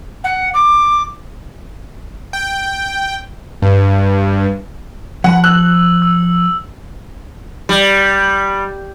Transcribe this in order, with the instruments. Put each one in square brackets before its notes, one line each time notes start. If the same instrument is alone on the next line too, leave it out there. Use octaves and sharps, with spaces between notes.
[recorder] F#5
D6
[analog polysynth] G5
G2
[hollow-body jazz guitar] F3 G#5 B5 [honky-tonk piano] F#5
[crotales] E6 F#7 [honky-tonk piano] F#6
[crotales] E6
[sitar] G3